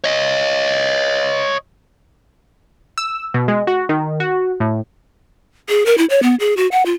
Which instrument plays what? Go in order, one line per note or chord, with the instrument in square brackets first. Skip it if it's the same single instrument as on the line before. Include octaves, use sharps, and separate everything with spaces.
[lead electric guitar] C#5 D#5
[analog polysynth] E6
B2
G#3
F#4
D#3
F#4
A2
[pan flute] G#4
A#4
E4
C#5
B3
G#4
F#4
F#5
F4